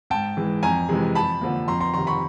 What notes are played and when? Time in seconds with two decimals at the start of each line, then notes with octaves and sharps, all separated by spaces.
0.10 G#2 G5 A5
0.37 E3 G#3
0.63 F2 G#5 A#5
0.89 C3 E3 G#3
1.15 F2 A5 B5
1.41 D3 F3 A#3
1.68 F2 A#5 C6
1.80 A#5 C6
1.94 C3 D#3 A#5 C6
2.07 B5 C#6